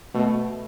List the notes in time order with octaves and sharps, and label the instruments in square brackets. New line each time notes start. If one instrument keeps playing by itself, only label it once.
[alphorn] B2 [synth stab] A3